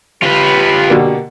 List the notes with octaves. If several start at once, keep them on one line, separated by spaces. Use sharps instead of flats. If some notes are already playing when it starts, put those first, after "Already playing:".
F4 G4 B4
B2 D3 A#3